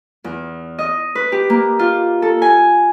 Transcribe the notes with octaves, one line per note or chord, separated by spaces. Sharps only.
E2
D#5
B4
G4
A#3
F4
A4
G#5